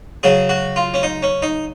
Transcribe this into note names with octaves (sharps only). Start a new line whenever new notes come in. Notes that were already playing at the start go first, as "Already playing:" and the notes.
C#3 F#3 G#4
F#4
F4
C#4
D#4
C#4
D#4